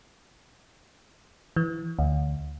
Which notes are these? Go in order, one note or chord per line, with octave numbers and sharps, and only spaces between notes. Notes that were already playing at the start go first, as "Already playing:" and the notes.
E3
D2